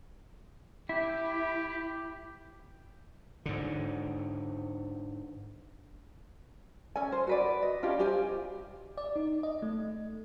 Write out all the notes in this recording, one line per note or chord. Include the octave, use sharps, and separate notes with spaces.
E4 G4
G#2 D3
C#4 A4 G#5
C5
F#4 B4 D5
D#5
C#4 D4 F4 G4
G4 C5 F5 G#5
D5
D#4
D#5
A3